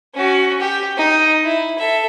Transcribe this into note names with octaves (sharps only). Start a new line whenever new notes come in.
C#4 F#4
G4
D#4
E4
A4 E5